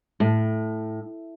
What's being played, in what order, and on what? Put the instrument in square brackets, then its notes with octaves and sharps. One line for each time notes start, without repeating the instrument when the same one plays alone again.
[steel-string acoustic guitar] A2